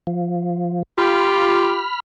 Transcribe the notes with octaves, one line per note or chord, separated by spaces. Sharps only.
F3
F4 G4 B5 F6